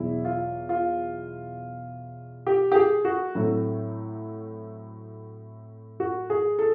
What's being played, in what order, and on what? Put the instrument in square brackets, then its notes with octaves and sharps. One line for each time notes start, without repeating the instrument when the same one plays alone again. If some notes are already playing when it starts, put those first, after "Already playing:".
Already playing: [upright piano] E2 B2 F#3 E4
F4
F4
G4
G4
G#4
F#4
A2 F#3 A3 C4
F#4
G#4
A4